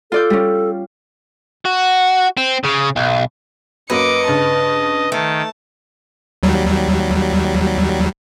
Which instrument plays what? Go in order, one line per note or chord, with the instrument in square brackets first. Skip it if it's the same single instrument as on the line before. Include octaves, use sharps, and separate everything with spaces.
[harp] F4 D5 G6 [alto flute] A4
[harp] G3 C#4
[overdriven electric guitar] F#4
C4
C#3
B1
[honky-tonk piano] F#2 F#3 A#3 [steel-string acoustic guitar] B4 [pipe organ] D#5 [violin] D6 C#7
[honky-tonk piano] G2 C#3 [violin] A5
[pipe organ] D#3 [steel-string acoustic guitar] A3 [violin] A5
[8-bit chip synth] D#2 F#3 G3